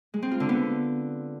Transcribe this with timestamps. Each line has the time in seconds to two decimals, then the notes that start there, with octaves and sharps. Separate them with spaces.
0.14 G#3
0.22 C4
0.31 F4
0.40 D3
0.49 B3